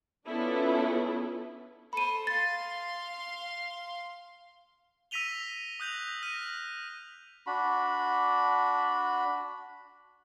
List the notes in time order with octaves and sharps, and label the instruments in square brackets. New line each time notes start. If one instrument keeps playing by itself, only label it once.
[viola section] B3 C#4 D4 E4 F4 A4
[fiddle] A4 C5 [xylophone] B5 D#7
[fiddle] F5 C6 [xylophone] A6
[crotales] E6 A#6 B6 D#7 F7 G7
D#6 F#6 G6 A#6 F7
F6 A#6 D#7
[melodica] D4 F#4 B5